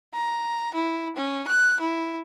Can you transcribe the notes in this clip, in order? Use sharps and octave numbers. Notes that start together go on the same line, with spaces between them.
A#5
E4
C#4
F#6
E4